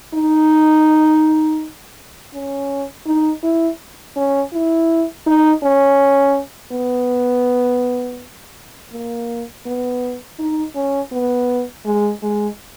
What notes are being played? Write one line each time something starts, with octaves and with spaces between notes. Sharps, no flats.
D#4
C#4
D#4
E4
C#4
E4
D#4
C#4
B3
A#3
B3
D#4
C#4
B3
G#3
G#3